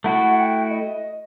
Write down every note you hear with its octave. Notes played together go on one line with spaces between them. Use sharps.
A3 E4 F#4 F#5
G5
D#5